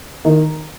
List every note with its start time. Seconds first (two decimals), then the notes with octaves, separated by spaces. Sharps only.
0.25 D#3